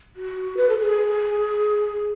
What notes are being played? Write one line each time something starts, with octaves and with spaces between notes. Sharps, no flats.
F#4
B4
A4
G#4